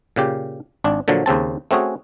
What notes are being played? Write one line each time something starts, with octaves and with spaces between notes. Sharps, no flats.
A#2 C#3 G4
G#1 D4
A#2 D3 F3 F#3
D#2 C#3 C4 A5
A3 C4 C#4 F#4 G#4